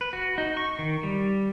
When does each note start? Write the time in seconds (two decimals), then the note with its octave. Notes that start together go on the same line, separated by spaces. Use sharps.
0.01 B4
0.13 F#4
0.38 D#4
0.57 C#6
0.79 D#3
1.03 G3